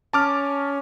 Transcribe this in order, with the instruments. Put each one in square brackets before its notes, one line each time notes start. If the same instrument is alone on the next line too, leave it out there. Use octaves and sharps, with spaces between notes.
[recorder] C#4 [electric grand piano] A5 D6 F6